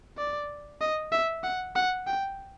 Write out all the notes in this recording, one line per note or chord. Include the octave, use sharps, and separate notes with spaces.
D5
D#5
E5
F#5
F#5
G5